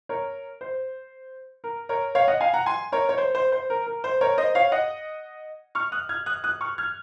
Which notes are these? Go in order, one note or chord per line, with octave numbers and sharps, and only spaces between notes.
A#4 C#5
C5
A#4
A#4 C#5
C#5 F5
D#5 F#5
F5 G#5
F#5 A#5
G#5 C6
A#4 C#5
C#5
C5
C5
C5
A#4
A#4
C5
A#4 C#5
C5 D#5
C#5 F5
D#5 F#5
C#6 F6
D#6 F#6
F6 G#6
D#6 F#6
D#6 F#6
C#6 F6
F6 G#6